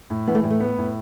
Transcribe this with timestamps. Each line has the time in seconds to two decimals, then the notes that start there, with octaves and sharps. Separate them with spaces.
0.10 A2
0.28 E3 B3
0.35 A3
0.43 A2 G3
0.51 A3
0.60 B3
0.78 A2